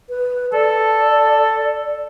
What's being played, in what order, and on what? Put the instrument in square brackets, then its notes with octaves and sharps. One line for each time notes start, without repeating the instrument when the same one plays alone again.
[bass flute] B4
[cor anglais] A4 [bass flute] D5